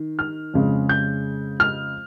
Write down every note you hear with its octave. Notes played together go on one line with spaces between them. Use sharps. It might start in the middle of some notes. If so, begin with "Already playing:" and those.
Already playing: D#3
F6
F2 C#3 G#3
G6
F6